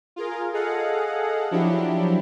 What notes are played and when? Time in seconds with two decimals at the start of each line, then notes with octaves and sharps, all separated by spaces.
0.16 F4 G#4 A#4
0.53 G#4 A4 D#5 F5 F#5
1.51 F3 F#3 D4 E4 G4